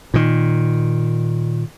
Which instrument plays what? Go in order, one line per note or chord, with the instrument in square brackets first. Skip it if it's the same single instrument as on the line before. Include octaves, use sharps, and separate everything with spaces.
[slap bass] A#2 D#3